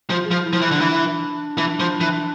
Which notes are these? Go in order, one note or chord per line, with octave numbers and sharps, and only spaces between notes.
F3
F4
G#4
F3
F4
E4
F3
E3
D3 D4
E3
E3
F3
E3